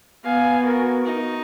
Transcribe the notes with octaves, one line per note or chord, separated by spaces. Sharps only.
B3 F5 G#5
F#4 A#4
D#4 F#4